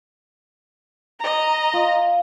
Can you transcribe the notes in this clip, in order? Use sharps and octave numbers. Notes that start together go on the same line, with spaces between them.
D#5 A#5
F4